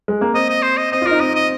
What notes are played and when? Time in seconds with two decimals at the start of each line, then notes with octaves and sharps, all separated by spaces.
0.08 G#3
0.21 A#3
0.34 C4 D#5
0.49 D#5
0.63 C5
0.77 D#5
0.92 C4 D#5
1.02 F4
1.06 D#4 A#4
1.20 C4 D#5
1.35 D#5